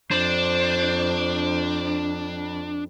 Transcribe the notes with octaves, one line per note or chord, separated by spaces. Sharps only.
F2 D4 C5